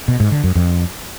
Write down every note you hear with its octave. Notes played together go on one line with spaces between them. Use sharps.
B2
G#2
D3
F#2
F2